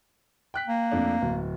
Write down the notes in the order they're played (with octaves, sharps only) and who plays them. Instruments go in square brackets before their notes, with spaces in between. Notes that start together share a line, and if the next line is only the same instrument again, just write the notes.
[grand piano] G5 F#6 B6
[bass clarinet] A#3
[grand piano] F2 A3 D4
D1